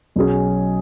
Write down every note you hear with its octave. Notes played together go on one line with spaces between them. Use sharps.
B1 B2 F#3 C#4 G#4